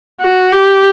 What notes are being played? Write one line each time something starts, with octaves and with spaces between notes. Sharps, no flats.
F#4
G4